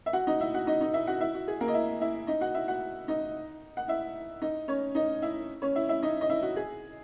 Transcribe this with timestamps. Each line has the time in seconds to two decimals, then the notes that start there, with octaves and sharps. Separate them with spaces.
0.06 E5
0.13 F#4 F#5
0.27 D#4 D#5
0.40 E4 E5
0.54 F#4 F#5
0.67 D#4 D#5
0.81 D#4 D#5
0.94 E4 E5
1.07 F#4 F#5
1.21 E4 E5
1.34 F#4
1.48 G#4
1.61 A#3 A#4
1.68 D#5
1.74 E4 E5
2.01 E4 E5
2.27 D#4 D#5
2.41 F#4 F#5
2.54 E4 E5
2.68 F#4 F#5
3.08 D#4 D#5
3.77 F#5
3.88 E4 E5
4.42 D#4 D#5
4.68 C#4 C#5
4.95 D#4 D#5
5.22 E4 E5
5.62 C#4 C#5
5.76 E4 E5
5.89 E4 E5
6.03 D#4 D#5
6.21 D#5
6.30 E4 E5
6.43 F#4
6.56 G#4